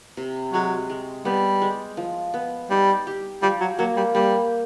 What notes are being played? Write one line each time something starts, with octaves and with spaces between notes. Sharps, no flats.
C3
F#3 G#3
G#3
G3 B3
G#3
F3
B3
G3 D#4
G4
F3 G3
F#3
F#3 A#3
G3
G3 A#3